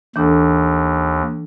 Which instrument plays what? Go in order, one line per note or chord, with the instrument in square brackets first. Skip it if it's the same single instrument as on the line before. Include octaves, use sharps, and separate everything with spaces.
[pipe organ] D#2 [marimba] E3 D4 A4